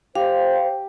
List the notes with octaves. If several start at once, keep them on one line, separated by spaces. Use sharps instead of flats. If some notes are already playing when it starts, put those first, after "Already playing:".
G4 C5 F5